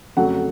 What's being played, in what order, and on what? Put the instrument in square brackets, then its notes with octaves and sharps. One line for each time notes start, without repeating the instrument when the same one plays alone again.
[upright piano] F2 C#3 F#3 A3 F#5